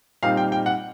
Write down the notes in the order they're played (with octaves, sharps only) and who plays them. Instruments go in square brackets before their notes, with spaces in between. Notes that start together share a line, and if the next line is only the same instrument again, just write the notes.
[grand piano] A#2 G3 C4 D#4 F5
G5
G5
F#5